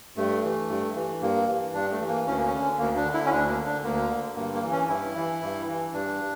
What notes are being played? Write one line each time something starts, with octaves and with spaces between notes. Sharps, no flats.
G2 A3
E3
G2
E3
G2 A#3
E3
G2 D4
A3
E3
A#3
D2 C#4
A#3
C#4
D3
D2 A#3
D4
D3
E4
C#4
D2 D4
A#3
D3
D4
D2 A#3
D3
G2 A#3
A#3
E3
C#4
G2 E4
E3
G2
E3
G2 D4